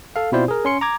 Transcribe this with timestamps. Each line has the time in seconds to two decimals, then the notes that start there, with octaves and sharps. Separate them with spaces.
0.16 A4 F5
0.32 B2 C4 E4 F4 C5 D5
0.48 G#4 A#4
0.65 C#4 C6 C#7
0.81 A#5 D6 G#6